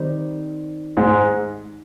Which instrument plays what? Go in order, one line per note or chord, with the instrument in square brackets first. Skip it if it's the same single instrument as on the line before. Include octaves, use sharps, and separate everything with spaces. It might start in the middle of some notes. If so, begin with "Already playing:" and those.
Already playing: [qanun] D#3 G3 C4 D#4
[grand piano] G#2 G#3